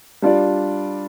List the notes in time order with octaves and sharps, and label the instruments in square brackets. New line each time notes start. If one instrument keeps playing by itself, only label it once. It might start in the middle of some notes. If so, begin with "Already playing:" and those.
[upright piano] G3 D4 F4 D5